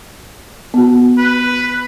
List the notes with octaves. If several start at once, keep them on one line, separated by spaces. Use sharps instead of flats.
B3 F#4
B4